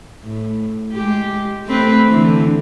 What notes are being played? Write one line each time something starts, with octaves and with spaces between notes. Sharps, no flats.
A2
G#3 G4
A3 C4 B4
D3 E3